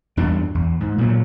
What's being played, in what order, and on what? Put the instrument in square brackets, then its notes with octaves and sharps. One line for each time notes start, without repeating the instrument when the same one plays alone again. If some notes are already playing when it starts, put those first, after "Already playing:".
[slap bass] E2 G2 D4
E2
G#2
A#2 F#3